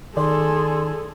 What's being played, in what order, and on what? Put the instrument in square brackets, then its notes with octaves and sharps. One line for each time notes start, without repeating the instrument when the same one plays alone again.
[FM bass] D#3 [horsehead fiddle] G#4 A4 [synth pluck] D5 [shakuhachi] C6